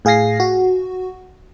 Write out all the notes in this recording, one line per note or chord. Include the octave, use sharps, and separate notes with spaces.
A2 G#4 F5 G#5 A#6 C7
F#4